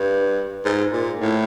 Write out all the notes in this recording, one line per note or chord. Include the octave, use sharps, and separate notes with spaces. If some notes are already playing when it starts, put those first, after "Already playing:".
Already playing: G2
G#2
A#2
A2